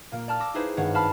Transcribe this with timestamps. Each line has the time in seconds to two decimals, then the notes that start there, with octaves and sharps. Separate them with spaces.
0.12 A#2 A#3
0.28 D5 A5 F6
0.40 D6 E6 A#6
0.54 D#4 E4 G4 G#4 B4 C5
0.77 G#1 G2 C#5 F#5
0.94 F5 A5 B5 F6